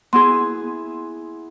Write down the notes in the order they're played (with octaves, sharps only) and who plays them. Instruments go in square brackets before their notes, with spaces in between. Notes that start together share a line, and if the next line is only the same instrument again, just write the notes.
[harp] B3 E4 G#4 [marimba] C6